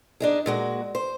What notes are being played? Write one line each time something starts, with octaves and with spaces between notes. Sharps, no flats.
D4 D#4 G#4
A#2 G#3 F#4
C5